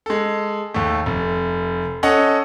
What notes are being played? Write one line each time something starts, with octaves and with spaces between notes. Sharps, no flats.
G#3 A4
D#2 A3
F1
C#4 A4 D#5 F#5